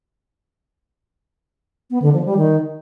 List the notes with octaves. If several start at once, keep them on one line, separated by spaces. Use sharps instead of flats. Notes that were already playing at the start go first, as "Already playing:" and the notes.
B3
D3
F3
G3
D#3